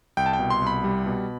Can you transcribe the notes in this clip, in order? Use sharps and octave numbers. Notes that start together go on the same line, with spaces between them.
C2 G5
A5
G5
B2
C6
C2
B5
G3
B2